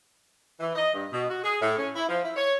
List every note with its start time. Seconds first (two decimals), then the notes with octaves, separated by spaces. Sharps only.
0.60 E3
0.75 D#5
0.93 G2
1.11 B2
1.29 F#4
1.43 G#4
1.61 A2
1.77 C#4
1.95 E4
2.08 F3
2.23 E4
2.36 C#5